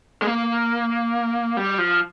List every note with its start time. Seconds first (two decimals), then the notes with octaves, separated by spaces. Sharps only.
0.22 G#3
0.27 A#3
1.57 G3
1.78 F3